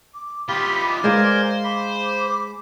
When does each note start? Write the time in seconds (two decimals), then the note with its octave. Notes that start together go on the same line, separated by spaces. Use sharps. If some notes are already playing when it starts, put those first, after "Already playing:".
0.14 D6
0.49 D#4 F4 G4 B5 D6
1.04 G#3 A#4 C5 D5 F5 G#5
1.64 B5 D6